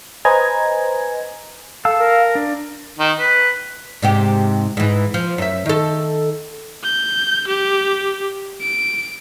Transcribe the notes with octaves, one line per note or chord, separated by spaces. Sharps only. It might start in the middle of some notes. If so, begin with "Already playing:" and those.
B4 C5 D#5 G#5 A#5 G#6
A4 F5 A5 E6
A#4
D4
D#3
B4
G#2 C3 G4
G#2 E3
F3
F#2 E5
D#3 A4
G6
G4
D7